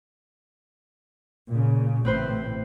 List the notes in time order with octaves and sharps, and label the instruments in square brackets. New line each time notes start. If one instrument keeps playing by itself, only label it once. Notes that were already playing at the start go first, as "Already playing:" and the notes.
[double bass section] A#2 C#3
[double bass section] A1 A2 [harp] C4 B4 C5